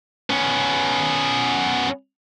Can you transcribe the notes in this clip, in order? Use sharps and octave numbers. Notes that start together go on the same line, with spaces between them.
B3 C#4